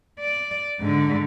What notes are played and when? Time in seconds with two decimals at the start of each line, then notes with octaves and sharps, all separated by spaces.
0.20 D5
0.80 G#2 D3